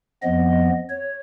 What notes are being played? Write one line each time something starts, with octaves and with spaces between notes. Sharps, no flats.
F2 F3 B3 D#5
C#5